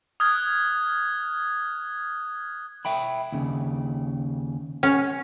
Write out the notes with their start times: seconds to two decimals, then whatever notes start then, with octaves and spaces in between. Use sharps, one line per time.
0.20 D#6 F6 F#6 G#6
2.85 E5 G5 B5
3.32 D#2 C#3
4.83 C#4